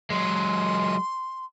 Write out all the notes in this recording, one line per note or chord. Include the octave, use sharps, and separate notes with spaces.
F#3 G#3 C6